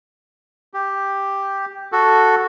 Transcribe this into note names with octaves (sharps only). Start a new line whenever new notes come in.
G4
F#4 A4